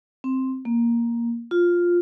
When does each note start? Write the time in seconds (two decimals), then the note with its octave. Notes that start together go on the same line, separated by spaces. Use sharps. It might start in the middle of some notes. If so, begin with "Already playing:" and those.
0.24 C4
0.65 A#3
1.51 F4